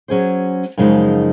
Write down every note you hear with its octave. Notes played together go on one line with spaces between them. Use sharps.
F#3 C#4 G#4 C5
F#2 C#3 F3 G#3 D#4